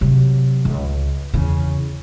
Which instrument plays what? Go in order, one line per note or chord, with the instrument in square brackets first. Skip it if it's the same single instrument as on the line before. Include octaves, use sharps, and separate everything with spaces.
[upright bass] C3 F#3
C#2
E2 C#3